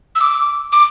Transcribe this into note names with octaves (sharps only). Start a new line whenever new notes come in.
E6
D6
D6